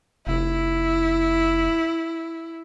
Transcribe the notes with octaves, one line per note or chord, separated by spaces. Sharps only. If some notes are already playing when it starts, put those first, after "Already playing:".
F1 E4